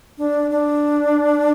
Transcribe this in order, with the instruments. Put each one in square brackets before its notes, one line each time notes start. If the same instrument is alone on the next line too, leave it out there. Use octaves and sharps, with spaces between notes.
[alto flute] D4
D4